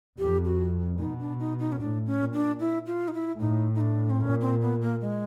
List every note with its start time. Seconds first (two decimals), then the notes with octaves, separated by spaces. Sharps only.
0.19 F2 G4
0.45 F#4
0.99 B2 D#4
1.19 D4
1.39 D#4
1.59 D#4
1.72 C#4
1.79 A2 D4
2.06 C#4
2.20 A#2
2.34 D4
2.60 E4
2.87 F4
3.08 D#4
3.14 E4
3.40 A2 D#4
3.75 D#4
3.81 D4
4.10 C4
4.20 A#2 C#4
4.41 C4
4.61 B3
4.81 A#3
5.01 G#3